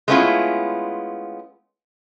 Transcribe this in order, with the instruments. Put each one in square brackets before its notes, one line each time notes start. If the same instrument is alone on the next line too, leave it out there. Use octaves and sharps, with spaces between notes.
[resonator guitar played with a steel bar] G#3 A3 B3 C#4 E4 F4